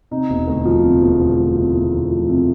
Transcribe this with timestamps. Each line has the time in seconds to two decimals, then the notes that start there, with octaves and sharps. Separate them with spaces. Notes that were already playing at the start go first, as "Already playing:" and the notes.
0.11 C3 D#4
0.30 E1
0.47 D2
0.65 F3
0.84 C3
1.02 E1
1.21 D2
1.38 F3
1.56 C3 E4
1.74 E1
1.93 D2
2.11 F3
2.29 C3